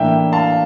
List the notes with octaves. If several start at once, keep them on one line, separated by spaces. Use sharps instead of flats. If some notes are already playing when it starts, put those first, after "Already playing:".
Already playing: A2 E3 A#3 D4 E5 G5
F5 A5